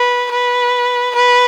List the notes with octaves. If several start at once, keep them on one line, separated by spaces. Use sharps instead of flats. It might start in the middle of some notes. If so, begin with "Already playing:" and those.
Already playing: B4
B4
B4